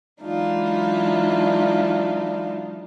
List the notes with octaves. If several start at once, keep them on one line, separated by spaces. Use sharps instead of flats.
E3 F#3 G#3 D4 D#4 F4